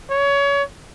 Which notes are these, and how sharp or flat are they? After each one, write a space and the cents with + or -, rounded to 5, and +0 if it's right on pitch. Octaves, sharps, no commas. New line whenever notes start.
C#5 +25